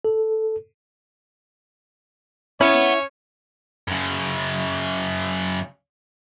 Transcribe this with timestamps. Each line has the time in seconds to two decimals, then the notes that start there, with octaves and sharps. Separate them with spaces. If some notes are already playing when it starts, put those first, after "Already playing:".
0.05 A4
2.61 C#4 E4 C#5 F#5 B5
3.88 F#2 C#3